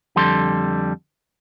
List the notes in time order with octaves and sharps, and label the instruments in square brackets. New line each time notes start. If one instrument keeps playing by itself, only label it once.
[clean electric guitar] F2 D3 G3 A4 C6